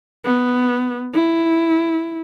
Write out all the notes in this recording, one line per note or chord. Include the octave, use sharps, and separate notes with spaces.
B3
E4